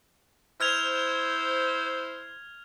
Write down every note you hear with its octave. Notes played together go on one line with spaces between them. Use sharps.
E4 C5 F6 G#6 F7